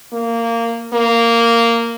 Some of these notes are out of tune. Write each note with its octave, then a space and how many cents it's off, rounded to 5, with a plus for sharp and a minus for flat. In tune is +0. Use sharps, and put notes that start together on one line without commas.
A#3 -15
A#3 -10